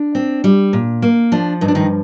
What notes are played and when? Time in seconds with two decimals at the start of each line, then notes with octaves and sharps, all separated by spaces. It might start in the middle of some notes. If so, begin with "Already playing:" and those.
Already playing: D4
0.15 C4
0.44 G3
0.73 A#2
1.02 A#3
1.32 F3 D4
1.61 G2 D#4
1.68 D4
1.75 D#3 D#4